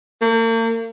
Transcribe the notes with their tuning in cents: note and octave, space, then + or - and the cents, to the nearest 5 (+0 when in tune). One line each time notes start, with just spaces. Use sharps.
A#3 -40